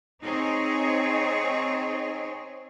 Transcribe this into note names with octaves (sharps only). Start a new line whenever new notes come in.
C4 D#4 G#4 C#5